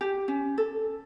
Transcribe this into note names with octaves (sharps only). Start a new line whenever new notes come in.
G4
C#4
A4